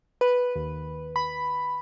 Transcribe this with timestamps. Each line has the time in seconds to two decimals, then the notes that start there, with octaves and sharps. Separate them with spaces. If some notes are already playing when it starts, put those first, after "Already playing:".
0.21 B4
0.56 D#2
1.16 B5